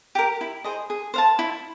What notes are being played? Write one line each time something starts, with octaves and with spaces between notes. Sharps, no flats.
G4 A#4
E4
G#4 C5 D#5
G#4
C5 F5 A5
E4